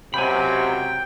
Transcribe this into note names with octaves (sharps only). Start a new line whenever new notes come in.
C#2 C3 F#3 G5 G#5 B5